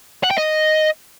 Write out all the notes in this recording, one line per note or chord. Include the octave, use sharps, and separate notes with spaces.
F#5
G5
D#5